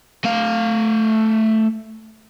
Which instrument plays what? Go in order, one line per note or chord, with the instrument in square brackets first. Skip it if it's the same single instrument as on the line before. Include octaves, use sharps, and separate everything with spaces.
[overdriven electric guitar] A3 F5